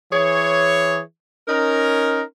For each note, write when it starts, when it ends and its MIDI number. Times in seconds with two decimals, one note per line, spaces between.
0.13 1.00 52
0.13 1.00 68
0.13 1.00 73
1.48 2.22 61
1.48 2.22 63
1.48 2.22 70